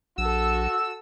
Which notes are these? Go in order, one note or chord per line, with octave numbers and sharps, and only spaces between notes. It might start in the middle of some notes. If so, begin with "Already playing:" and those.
A#1 F#4 A4 E6